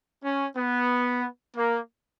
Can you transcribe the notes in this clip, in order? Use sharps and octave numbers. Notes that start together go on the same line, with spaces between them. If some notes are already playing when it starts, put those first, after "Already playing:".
C#4
B3
A#3